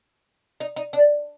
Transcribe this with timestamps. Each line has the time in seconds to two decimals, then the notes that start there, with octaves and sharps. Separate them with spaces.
0.60 D#4
0.76 D#4
0.93 D4